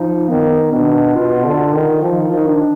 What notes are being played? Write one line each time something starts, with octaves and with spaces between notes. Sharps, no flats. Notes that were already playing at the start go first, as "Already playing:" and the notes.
Already playing: F3 D#4
D#3 B3
B2 D4
B2 F4
D3
D#3
F3 D#4
D#3 F4
D#4
D4